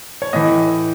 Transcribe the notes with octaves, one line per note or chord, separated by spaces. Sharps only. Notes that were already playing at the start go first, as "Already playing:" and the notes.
C#5
A2 E3 D#5